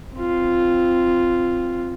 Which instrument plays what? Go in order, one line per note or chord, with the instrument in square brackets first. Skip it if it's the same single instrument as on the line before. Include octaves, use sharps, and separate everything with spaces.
[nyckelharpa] C4 F4